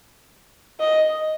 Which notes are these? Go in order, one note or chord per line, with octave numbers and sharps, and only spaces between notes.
D#5